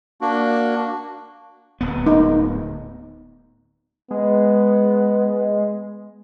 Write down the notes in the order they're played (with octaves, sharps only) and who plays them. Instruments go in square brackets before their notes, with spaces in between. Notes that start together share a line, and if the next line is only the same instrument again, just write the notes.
[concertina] A#3 D4 F#4
[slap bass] D1 B3
[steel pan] D#4
[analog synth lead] G#3 [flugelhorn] B3